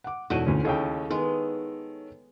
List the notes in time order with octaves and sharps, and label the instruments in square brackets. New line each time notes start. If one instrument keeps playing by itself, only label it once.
[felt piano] F#5 D6
[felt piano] E1 D#7 [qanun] A3 D#4 E4 [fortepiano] F#4 C#5
[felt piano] D2 D3 [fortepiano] C#4
[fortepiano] D#2 C#3 G5 [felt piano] A4 C#5
[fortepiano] D#3 [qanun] G#3 B3